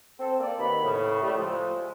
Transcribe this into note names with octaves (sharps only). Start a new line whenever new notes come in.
C4 A4
A#3 D5
D#2 B2 D#3 B5
A2 C#3
G3 A3
F3 G#3